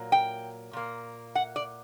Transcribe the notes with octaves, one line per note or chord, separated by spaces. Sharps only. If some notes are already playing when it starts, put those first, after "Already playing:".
Already playing: A#2 F#3 A#3
G5
A#2 A#3
F#5
D5